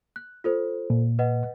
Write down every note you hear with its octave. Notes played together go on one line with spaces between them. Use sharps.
F#6
F4 A4 C5
A#2
B4 D#5 F#5